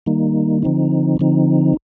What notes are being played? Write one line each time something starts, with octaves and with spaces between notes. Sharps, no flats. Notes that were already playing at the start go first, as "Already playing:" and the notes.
D#3 G3 A#3 D#4
D3 F3 C4 D#4
D3 F3 C4 D#4